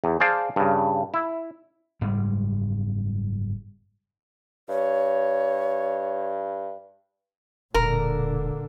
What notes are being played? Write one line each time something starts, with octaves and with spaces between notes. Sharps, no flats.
E2
G#4 C5 D5 F5 A5
G2 C#3
E4
F#1 G#2 G3 G#3
G2 C#5
E1 A#2 D3 A#4